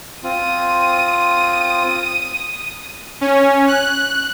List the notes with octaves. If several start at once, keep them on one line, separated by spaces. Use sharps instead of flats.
C4 F4 D#6 D#7
C#4
F#6